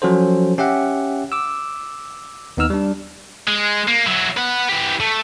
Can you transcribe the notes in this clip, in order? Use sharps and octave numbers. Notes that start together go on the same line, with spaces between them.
F3 F#3 C#4 F#4 A4 C5
C#4 G4 E5 F#5
D6 E6
D#2 B3 D#4 E6 F6
G3 D4
G#3
A#3
F#3 E4
B4 F#5
E3 G4
A3